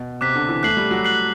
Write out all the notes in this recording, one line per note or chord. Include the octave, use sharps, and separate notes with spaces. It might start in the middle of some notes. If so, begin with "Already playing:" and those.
Already playing: B2
C3 D6 F#6 B6
D3
E3
A3 F#6 C7 F#7
G3
F#3
F#6 C7 F#7